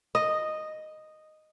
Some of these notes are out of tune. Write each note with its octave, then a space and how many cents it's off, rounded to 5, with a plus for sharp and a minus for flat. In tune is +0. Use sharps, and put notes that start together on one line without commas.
D#5 -5